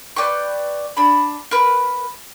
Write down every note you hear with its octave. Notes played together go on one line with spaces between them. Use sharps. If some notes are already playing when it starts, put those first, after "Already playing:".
B4 D5 G5 C#6
D4 B5
A#4 B4